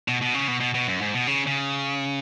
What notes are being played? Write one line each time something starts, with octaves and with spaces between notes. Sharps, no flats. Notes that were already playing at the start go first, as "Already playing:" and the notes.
B2
B2
C#3
B2
B2
B2
F#2
G#2
B2
C#3
C#3